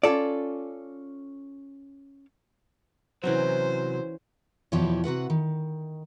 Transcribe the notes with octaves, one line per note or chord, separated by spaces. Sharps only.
C#4 F4 A4 D5
C3 E3 F#3 C#4 F#4 C5
E2 B2 F3 E4 G4 C#5
C3 F#4 B4 F#5
D#3